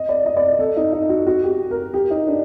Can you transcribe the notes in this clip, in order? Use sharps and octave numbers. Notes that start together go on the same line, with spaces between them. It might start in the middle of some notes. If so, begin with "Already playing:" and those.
Already playing: D#5
D5
D#5
D5
A4
D#4
D#4
F#4
F#4
G4
A#4
G4
D#4
D4